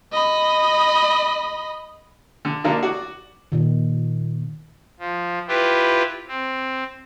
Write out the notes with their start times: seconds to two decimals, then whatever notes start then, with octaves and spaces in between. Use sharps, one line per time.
0.12 D#5 B5
2.45 D3
2.64 D3 F#3 A#3 D4 D#4
2.83 F#4 D5
3.52 A#2 D#3
5.00 F3
5.48 E4 F4 G4 B4
6.28 C4